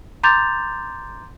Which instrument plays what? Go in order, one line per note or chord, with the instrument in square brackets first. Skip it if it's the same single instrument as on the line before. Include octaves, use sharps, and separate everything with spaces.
[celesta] A#5 C6 D6 G6 A6 F7